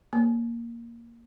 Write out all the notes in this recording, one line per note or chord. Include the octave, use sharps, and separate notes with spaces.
A#3